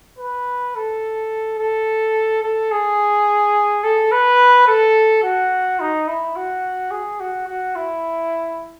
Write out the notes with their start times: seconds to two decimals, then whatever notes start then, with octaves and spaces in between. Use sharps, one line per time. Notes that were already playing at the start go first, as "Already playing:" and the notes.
0.19 B4
0.75 A4
1.59 A4
2.43 A4
2.71 G#4
3.84 A4
4.12 B4
4.67 A4
5.23 F#4
5.80 D#4
6.08 E4
6.36 F#4
6.91 G#4
7.20 F#4
7.48 F#4
7.76 E4